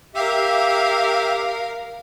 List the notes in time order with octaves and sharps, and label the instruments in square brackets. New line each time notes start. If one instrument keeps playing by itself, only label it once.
[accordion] G4 E5 [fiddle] A#4 F5